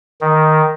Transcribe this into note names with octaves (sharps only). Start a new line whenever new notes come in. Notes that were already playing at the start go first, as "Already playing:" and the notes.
D#3